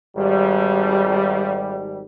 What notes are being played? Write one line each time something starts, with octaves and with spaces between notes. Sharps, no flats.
G#1 G3